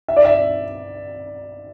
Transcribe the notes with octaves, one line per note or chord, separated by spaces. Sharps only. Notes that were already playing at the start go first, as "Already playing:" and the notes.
E5
D5
E5